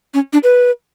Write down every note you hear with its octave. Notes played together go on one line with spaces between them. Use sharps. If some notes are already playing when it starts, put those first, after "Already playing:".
C#4
D4
B4